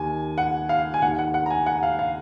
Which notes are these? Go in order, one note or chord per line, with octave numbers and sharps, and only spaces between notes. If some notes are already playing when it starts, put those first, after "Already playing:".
Already playing: D#2 D#3 G#5
F#5
F5
G#5
D#2 D#3 F#5
F#5
F#5
A#5
G#5
F#5
F5
F5